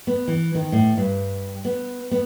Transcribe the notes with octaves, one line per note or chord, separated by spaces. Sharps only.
B3
E3
D#3
A2
G2
B3
B3